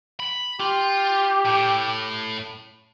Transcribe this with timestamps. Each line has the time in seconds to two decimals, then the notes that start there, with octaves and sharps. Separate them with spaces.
0.20 B5
0.60 F4 G4
1.45 A2